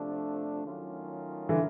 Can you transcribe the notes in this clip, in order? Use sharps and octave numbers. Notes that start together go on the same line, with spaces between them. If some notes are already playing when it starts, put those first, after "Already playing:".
Already playing: C3 F3 A3 D4
D#3 F#3 A3 C#4 F4
D3 E3